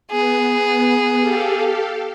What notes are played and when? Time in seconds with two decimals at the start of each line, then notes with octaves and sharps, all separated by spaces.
0.11 B3 G#4
1.20 G4 A4 F5